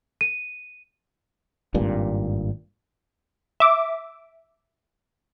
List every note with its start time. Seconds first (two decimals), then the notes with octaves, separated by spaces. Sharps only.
0.21 D#7
1.74 G#1 G2 A#2
3.60 E5 D6